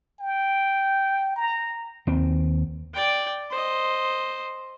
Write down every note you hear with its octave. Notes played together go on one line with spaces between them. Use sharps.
G5
A#5
D#2 C4
D5 G5
C5 D#5